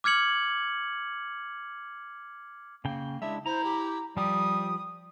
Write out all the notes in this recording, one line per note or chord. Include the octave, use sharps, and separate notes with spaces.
D6 F6 G#6 C#7 F#7
C#3 A#3 G5
G#3 D4 E4 E5
E4 C5 A#5
G4
F3 G3 G4 D#6